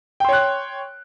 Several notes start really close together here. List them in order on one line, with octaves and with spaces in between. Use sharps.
G5 C6 C#5 F#6